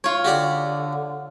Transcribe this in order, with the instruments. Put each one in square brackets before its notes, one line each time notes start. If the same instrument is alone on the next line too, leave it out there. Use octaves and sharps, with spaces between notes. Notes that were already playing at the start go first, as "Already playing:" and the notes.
[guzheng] F4 C#5
[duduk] D3 [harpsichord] F#4 G4 D5